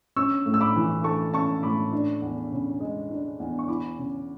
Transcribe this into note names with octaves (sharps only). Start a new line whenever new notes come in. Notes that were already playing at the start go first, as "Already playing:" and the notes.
C#4 C#6 E6
A2
E6
B5 D6
E3
A3 A5 C#6
C#4 A5 C#6
A2 B5 D6
D4
E2
C#3
G#3
D4
E2
C#6
E4 B5 D6
C#3